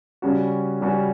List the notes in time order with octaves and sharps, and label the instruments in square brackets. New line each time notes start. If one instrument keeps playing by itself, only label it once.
[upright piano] C#3 G3 C#4 F#4
C#3 G3 C#4 F#4